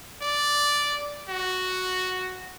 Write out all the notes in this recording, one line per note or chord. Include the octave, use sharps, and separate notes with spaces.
D5
F#4